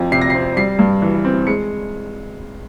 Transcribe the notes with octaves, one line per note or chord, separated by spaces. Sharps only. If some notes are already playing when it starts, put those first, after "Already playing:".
Already playing: F2 F3
C3 C7
A#6
C4 C7
G3 C7
G2
E3
C4
G#3 C#7